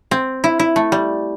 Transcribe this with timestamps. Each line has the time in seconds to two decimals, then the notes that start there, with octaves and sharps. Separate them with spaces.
0.11 C4
0.44 E4
0.59 E4
0.76 A3
0.92 G3